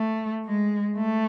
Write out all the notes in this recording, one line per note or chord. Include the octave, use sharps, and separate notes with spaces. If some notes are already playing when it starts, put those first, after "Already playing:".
Already playing: A3
G#3
A3